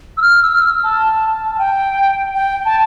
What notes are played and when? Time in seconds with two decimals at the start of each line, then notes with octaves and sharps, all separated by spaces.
0.17 E6
0.22 F6
0.43 E6
0.53 F6
0.68 E6
0.83 A5
1.44 A5
1.55 A5
1.58 G5
2.35 G5
2.65 A5